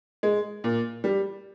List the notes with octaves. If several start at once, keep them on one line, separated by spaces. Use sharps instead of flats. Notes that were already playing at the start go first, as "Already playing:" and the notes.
G#3
A#2
G3